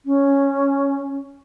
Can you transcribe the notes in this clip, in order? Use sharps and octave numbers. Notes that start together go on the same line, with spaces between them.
C#4